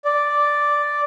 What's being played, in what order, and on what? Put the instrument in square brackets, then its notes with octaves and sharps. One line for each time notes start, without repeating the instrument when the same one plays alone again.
[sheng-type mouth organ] D5